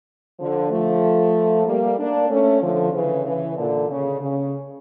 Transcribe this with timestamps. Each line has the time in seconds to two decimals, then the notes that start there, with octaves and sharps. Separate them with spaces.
0.39 D3 F3
0.70 F3 A3
1.66 G3 A#3
1.97 A#3 D4
2.29 A3 C#4
2.61 D3 F3
2.92 C#3 E3
3.24 C#3 E3
3.56 A#2 D3
3.88 C#3
4.20 C#3